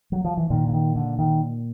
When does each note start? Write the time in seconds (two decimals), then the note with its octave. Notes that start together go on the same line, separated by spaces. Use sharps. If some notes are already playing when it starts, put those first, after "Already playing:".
0.12 F#3
0.25 F3
0.37 E3
0.50 A#2 D#3
0.68 D3
0.73 D#3
0.96 D3
1.19 D#3